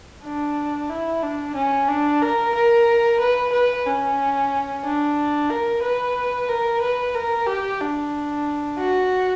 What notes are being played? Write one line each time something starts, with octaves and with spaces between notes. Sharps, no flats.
D4
E4
D4
C#4
D4
A#4
A#4
B4
B4
C#4
D4
A#4
B4
A#4
B4
A#4
G4
D4
F#4